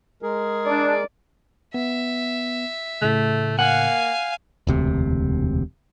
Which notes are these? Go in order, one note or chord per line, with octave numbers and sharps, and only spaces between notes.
G#3 G#4 A#4
D4 D5
B3 E5
A2 C#3 A3
A#3 F5 F#5 G#5
E1 D2 C3